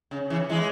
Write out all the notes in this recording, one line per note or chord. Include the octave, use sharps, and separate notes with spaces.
C#3
C#3 E3
E3 G#3